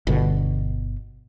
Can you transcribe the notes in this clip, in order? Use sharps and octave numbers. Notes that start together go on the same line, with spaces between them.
G1 B2 D3